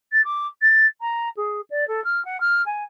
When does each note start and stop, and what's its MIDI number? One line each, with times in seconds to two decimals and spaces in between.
0.12 0.24 93
0.24 0.47 86
0.61 0.86 93
1.01 1.29 82
1.36 1.61 68
1.70 1.87 74
1.87 2.03 69
2.04 2.23 89
2.25 2.40 78
2.40 2.62 89
2.66 2.83 80